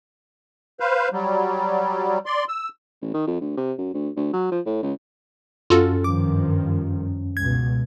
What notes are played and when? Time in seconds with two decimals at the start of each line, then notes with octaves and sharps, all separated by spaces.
0.80 B4 C5 F5
1.12 F#3 G3
2.26 D5 C6
2.49 E6
3.02 A1
3.14 D#3
3.27 F2
3.41 D2
3.57 C3
3.78 F#2
3.94 D2
4.17 D2
4.33 F#3
4.52 F3
4.66 A2
4.83 C#2
5.70 F#2 C#4 F4 F#4 A4
6.04 G2 D#3 F3 D6
7.37 C#2 B2 G#6